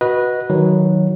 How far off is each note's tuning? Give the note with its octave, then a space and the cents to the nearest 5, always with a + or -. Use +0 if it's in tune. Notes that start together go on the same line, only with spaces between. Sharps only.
F#4 +0 B4 -15 D#5 +0
D#3 +0 F#3 +0 D#4 +25